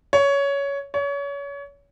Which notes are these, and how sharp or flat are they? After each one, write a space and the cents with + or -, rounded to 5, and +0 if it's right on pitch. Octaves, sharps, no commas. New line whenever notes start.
C#5 +15
C#5 +30